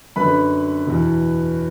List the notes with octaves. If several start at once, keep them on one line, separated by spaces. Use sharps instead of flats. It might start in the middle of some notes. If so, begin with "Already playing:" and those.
F#2 D3 B4 B5
E2 B2